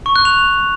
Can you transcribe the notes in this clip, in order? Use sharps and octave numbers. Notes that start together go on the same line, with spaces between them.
C#6
F#6
F7